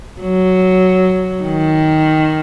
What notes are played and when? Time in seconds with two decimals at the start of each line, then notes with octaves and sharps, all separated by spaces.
0.22 F#3
1.43 D#3